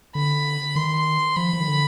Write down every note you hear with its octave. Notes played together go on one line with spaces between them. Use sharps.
D3 B5
D#3 C6
F3 B5
F3
D#3
D3